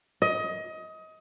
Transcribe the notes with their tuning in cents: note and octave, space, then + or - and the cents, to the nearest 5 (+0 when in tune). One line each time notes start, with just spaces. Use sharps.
D#5 +25